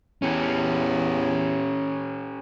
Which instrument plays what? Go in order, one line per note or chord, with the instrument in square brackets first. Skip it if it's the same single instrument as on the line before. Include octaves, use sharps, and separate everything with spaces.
[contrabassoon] E2 [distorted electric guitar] C#4 G4